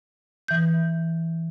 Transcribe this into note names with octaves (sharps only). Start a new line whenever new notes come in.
E3 G6